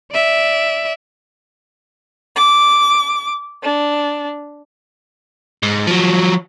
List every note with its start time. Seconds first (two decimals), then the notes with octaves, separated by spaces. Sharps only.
0.11 D5 E5
2.35 D6
3.62 D4
5.63 G#2
5.87 F3 F#3